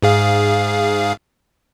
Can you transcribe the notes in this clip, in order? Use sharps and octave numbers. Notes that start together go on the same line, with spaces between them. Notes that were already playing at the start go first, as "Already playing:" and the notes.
G#2 G#4 F5